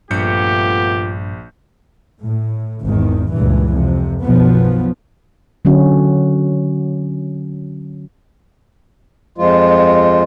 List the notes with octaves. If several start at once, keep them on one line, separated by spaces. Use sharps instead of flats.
A#1 G2 A3 B3 F4 G4 G6 C#7
A2
G#1 E2 D#3
C#2 G2 A#2 E3
F2 C3
B1 F#2 B2 F3 B3
D3 F#3 C#4 F#4
F2 F3 G#3 F4